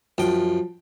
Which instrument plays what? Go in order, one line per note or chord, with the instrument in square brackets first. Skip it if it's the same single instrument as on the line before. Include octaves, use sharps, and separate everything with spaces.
[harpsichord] F#2 G5 [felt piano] F3